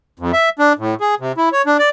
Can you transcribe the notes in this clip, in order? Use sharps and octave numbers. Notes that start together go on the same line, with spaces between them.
F2
E5
D4
A2
G#4
C3
E4
C#5
D4
D5